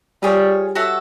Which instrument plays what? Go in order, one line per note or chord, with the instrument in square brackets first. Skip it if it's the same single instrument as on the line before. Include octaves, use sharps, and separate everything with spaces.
[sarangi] G3 [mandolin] F4 G#4 C#5
[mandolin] F#4 A4 C#5 E5